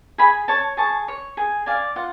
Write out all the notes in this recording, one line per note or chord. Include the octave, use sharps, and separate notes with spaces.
G#4 G#5 B5
C#5 A5 C#6
G#4 A5 C#6
C#5
G#4
D5 F5 G#5
F4 F#5